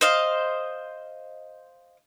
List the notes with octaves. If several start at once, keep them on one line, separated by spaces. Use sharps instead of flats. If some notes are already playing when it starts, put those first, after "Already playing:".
C5 D#5 F5